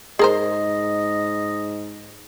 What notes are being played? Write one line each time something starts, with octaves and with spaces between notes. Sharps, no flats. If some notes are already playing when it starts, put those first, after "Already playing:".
G#2 G#4 A#4 C5 D#5